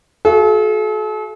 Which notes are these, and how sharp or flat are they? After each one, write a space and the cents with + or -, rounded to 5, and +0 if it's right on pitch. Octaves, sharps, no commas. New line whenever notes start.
F#4 -5 A4 -45 F5 -40